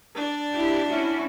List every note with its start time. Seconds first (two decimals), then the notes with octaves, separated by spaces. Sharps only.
0.15 D4 D5
0.53 E4 G4
0.90 C#4 E4 F#4